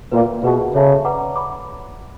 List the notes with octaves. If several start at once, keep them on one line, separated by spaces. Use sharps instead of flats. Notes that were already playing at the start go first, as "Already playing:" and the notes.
A#2 B4 E5 G5 B5
B2 F4 G#4 B4 E5 A5
C#3 A4 C#5 E5 A5
B4 D5 F#5 A#5 D6
B5 D6